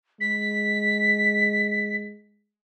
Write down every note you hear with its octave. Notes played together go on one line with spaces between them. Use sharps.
G#3 B6